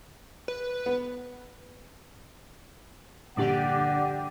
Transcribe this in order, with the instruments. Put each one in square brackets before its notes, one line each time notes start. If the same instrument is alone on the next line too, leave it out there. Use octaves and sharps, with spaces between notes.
[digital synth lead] B4
[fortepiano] B3
[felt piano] A#1 G2 A#2 [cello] D3 [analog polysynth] G4 D5 [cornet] F#5